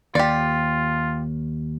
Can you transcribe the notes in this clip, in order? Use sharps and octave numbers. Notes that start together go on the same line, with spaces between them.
D#2 F4 G4 D5